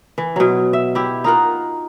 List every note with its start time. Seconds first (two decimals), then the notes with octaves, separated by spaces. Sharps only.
0.18 E3
0.36 B2 F#3
0.73 E5
0.95 E4 G4
1.24 D#4 F4 A#4 F#5